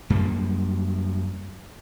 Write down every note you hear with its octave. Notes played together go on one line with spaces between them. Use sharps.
F#2 G3 A#3